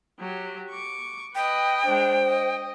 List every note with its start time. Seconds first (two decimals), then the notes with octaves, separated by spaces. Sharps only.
0.19 F#3 G4
0.70 C#6 D6
1.35 B4 D#5 G5
1.85 G#3 D4 C5
2.26 D#5